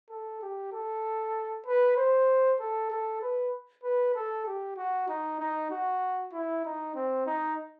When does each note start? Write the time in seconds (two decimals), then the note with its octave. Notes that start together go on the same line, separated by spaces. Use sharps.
0.10 A4
0.42 G4
0.72 A4
1.66 B4
1.97 C5
2.59 A4
2.90 A4
3.22 B4
3.83 B4
4.15 A4
4.47 G4
4.77 F#4
5.08 D#4
5.40 D#4
5.71 F#4
6.33 E4
6.65 D#4
6.95 C4
7.26 D#4